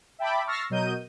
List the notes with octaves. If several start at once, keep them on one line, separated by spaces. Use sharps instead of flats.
E5 G5 A5 B5 D6
C#6 E6 F6 A6 A#6 C7
B2 F#3 A#4 D#5 G6 D#7